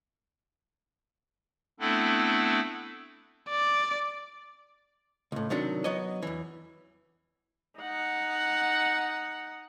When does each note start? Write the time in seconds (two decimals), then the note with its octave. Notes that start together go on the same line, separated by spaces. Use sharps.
1.80 A3 B3 C4 D4 E4 A4
3.49 D5
5.32 C#2 A2
5.50 C3 D#3 F#3 D4
5.84 F#3 B3 C#5 D#5
6.23 E2 E3
7.80 D#4 F#5